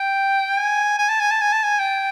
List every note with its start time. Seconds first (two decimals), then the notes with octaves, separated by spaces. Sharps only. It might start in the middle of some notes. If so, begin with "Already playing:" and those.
Already playing: G5
0.58 G#5
0.98 G#5
1.09 A5
1.20 G#5
1.31 A5
1.41 G#5
1.52 A5
1.63 G#5
1.79 G5